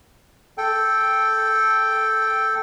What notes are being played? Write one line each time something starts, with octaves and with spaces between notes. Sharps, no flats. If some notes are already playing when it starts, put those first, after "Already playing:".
A4 G5